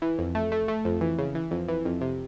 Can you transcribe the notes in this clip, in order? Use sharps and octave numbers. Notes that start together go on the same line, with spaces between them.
E3
F2
A3
A3
A3
F2
E3
C#3
E3
F2
E3
F2
C3